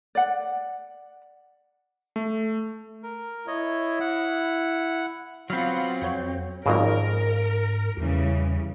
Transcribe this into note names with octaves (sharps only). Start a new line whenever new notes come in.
D5 F#5
A3
A#4
E4 C#5 D#5
F#5
F#3 B3 C4 F4 F5 F#5 B5
F2 C#5 G6
G#1 F2 G#2 C#3 A#4
E2 C#3 E3 G3